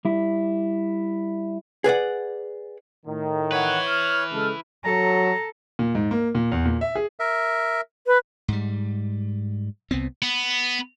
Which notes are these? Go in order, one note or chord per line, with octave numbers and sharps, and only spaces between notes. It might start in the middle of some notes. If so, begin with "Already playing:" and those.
G3 E4
G#4 B4 D5 F#5
A2 D#3
E4 B4 C#5 F#5
F6
C#3 G#3 A4
F#3 A4 A#5
A#2
G#2
A#3
A#2
E2
A#2
E5
G#4
A#4 E5
B4
G#2 G3
C2 B3 C4
B3